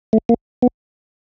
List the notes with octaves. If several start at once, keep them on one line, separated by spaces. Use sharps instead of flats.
A3
A#3
B3